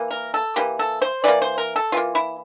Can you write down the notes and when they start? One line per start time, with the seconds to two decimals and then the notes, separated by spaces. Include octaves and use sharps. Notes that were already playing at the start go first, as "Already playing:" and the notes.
Already playing: E3 A#3
0.11 A#4
0.34 A4
0.56 E3 A#3 G4
0.79 A4
1.02 C5
1.24 E3 A#3 D5
1.42 C5
1.58 A#4
1.76 A4
1.92 E3 A#3 F4
2.15 E4